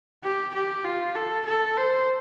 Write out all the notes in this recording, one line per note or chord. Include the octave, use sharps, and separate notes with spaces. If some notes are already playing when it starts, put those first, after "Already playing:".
G4
G4
F4
A4
A4
C5